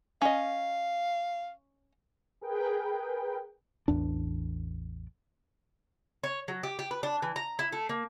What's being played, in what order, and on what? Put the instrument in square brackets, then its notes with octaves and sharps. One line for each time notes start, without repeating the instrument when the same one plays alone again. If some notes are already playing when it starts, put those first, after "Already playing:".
[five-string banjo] C#4 D#5 [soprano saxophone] F5
[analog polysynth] G#4 A#4 B4 G5
[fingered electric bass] A1 E2 D4
[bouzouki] C#5
F#3
G4
G4
B4
D4
E3
A#5
E4
A3
A#3